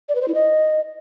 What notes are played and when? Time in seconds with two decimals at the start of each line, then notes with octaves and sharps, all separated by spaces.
0.09 D5
0.15 B4
0.22 C5
0.28 E4
0.35 D#5